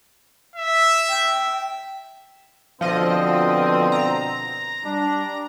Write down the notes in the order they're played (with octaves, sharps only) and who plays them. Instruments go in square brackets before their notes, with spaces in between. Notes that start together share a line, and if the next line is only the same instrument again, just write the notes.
[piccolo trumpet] E5
[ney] G5
[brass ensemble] B2 D3 C4 [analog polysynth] F3 D#5
[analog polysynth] A#5
[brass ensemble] G3 D4